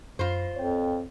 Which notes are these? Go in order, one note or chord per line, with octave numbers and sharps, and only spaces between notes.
F#2 F4 C5 B5 A#6
F2 C#5 G5